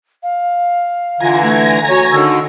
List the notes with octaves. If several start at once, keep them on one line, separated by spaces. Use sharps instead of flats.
F5
D3 E3 F4 G#5 A#5
A3
F#4 C#5
D3 D#3 E6